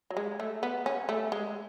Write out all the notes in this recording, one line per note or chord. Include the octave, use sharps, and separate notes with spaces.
F#3
G#3
A3
B3
C#4
A3
G#3